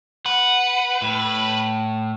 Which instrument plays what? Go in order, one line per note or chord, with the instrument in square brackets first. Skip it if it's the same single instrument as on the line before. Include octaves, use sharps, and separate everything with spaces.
[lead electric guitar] B4 [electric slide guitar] F#5
[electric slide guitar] A2